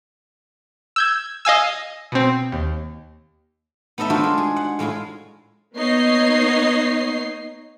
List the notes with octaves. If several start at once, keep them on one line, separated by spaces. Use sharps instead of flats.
E6 G6 G#6
D#5 F5 G#5 E6
B2 C4
D#2
B3 D#4 A4 D#5 E5
D4 F4 F#4 A4 B4 C5
G#3
G#4
F#5
A2 G#3 F4 G#4
A#3 B3 D#4 C#5 D#5 C7